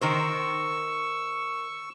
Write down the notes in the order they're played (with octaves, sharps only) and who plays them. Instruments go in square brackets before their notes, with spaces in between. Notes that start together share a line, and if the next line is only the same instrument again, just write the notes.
[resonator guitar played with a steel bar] D#3 A#4 C5 [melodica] C#6 E6